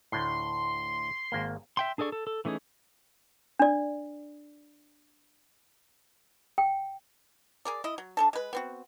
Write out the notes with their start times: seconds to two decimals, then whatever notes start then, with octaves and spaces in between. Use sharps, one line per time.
0.12 D2 A2 C6
1.32 G#1 A#3
1.77 E5 G5 C6
1.98 D4 G#4 A4 D5 C#6
2.12 A4
2.27 A4
2.45 E3 A3 C#4 D#4 G#4
3.59 D4 D5
6.58 G5
7.65 G#4 A#4 D5
7.84 E4 D#5
7.98 F#3
8.17 D4 A4 A5
8.33 G#3 B4
8.53 B3 C4 F#4